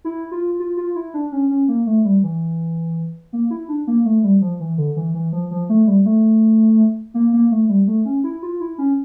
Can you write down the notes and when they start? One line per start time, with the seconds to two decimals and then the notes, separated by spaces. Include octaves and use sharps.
0.05 E4
0.31 F4
0.60 F4
0.77 F4
0.95 E4
1.14 D4
1.32 C#4
1.50 C#4
1.68 A#3
1.86 A3
2.05 G3
2.23 E3
3.33 A#3
3.51 E4
3.69 D4
3.87 A#3
4.05 A3
4.24 G3
4.41 F3
4.60 E3
4.78 D3
4.96 E3
5.14 E3
5.32 F3
5.51 F3
5.69 A3
5.87 G3
6.06 A3
7.14 A#3
7.33 A#3
7.51 A3
7.69 G3
7.87 A3
8.05 C#4
8.24 E4
8.43 F4
8.60 E4
8.78 C#4